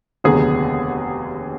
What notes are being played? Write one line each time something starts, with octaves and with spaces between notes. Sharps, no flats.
F1 D#2 D3 F#3 B3 G#4